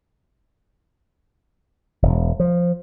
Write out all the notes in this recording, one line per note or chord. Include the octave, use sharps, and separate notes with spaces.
E1
F3